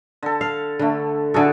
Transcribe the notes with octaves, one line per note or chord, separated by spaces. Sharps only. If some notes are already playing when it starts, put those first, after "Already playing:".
D3 A4
F5
D3 A3 B5
D3 E4 F#4 G#4 A4